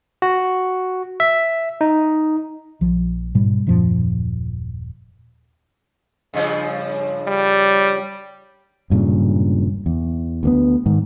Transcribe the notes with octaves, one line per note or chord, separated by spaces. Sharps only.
F#4
E5
D#4
A#1 F3
G#2 B2 G3
D#1 F#2 A#2 F3
G2 C#3 F3
G3
E1 G2 A#2 C#3
E2
D2 A#3 B3
G#2 D#3